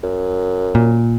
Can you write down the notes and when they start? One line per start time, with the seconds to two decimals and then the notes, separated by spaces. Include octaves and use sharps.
0.03 F#2
0.75 A#2